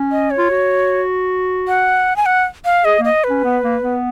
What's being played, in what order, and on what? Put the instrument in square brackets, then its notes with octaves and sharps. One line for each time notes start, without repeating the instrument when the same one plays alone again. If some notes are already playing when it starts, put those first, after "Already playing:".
Already playing: [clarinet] C#4
[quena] D#5
C#5
[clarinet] F4
F#4
[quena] F#5
G#5
F#5
F5
[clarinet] G#4 [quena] D#5
[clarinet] A#3 [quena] D#5
[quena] B4
[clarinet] C#4
B3
A#3
B3